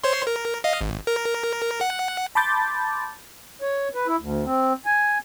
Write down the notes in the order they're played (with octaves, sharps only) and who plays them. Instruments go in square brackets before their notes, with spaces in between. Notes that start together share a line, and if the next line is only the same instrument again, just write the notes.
[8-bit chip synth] C5 C#5 C6
A#4
D#5 F5
G#1
A#4
F#5
[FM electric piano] A5 B5 C6 D6 G6 A6
[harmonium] C#5
B4
E4
D2
C4
G#5